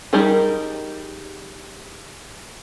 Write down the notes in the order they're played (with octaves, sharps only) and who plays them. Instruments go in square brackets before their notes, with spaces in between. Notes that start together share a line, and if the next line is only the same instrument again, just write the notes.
[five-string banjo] G3 D#4 G4 G#4 A#4